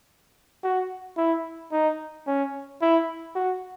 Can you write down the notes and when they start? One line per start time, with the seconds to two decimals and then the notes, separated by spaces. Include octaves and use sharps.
0.63 F#4
1.17 E4
1.72 D#4
2.27 C#4
2.81 E4
3.35 F#4